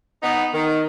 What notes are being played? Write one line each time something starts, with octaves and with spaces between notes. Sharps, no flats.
B3 D#4
D#3